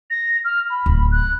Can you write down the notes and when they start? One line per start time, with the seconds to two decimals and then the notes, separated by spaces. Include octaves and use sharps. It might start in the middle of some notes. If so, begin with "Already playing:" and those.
0.10 A#6
0.45 F6
0.70 B5
0.86 D1
1.11 F#6